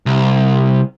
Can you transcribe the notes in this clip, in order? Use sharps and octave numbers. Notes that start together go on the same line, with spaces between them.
C2